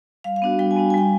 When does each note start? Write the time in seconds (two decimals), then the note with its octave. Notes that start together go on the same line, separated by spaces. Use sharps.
0.24 G3 F5
0.36 F5
0.42 B3 D4 F#4
0.59 G3 G5
0.71 G#5
0.76 B3 D4 F#4
0.90 G#5
0.94 G3 G5